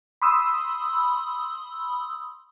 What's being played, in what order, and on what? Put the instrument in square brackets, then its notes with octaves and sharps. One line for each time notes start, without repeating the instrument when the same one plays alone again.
[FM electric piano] B5 C6 D#6 E6